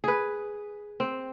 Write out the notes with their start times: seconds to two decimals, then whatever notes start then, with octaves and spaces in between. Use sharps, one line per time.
0.04 G#4 B4
1.00 C4